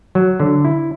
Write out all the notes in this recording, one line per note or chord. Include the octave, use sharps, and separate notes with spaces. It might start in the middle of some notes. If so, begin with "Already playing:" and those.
F#3
D3
E4